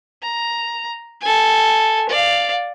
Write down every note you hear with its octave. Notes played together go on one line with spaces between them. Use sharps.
A#5
A4 G#5
D5 F5